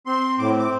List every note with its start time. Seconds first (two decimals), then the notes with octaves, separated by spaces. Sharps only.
0.06 C4 C6
0.39 A2 D6
0.59 D6